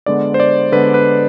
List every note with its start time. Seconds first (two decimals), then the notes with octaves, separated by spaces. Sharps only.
0.06 D3 G#3 B3 D5
0.34 C5
0.40 D5
0.72 D3 G#3 B3 B4
0.94 B4